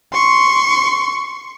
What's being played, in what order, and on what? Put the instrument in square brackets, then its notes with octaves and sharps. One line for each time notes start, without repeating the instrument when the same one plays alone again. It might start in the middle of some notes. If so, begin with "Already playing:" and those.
[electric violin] C6 C#6